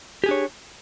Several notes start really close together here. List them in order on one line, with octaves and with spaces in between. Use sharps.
G4 G#4 D4 C#5